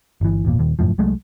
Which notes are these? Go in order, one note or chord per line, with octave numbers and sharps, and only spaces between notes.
G1 E3
G#1 E2 A#2
D#1 D#2
F1 F#2 A2 F3
C2 F#3 G#3 A3